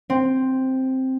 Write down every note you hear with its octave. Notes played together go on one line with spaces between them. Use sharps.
C4